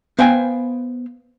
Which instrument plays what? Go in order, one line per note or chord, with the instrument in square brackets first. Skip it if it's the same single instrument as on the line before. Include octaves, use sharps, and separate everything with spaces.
[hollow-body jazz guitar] B3 C5 F5 G5 G#5